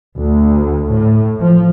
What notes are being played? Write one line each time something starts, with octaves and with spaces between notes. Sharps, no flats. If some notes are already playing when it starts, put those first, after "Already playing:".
D2
A2
F3